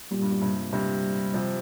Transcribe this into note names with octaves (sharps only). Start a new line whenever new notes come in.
A#2 G3
G2
A#2
G2 C3
G2 C3 G3
C3 F3